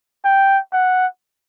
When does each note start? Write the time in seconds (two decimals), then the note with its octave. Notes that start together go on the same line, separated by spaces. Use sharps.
0.25 G5
0.73 F#5